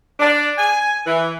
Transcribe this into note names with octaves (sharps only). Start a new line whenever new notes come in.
D4
G#5
E3